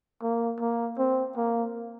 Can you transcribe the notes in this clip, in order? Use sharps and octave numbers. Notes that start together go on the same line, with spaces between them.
A#3
A#3
C4
A#3